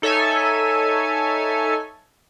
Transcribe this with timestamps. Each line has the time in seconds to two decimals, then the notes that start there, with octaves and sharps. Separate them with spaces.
0.02 D#4 A4 C#5 E5 G#5